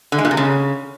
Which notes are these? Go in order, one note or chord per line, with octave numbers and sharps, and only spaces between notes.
D3
G#3
A#2
C3
C#3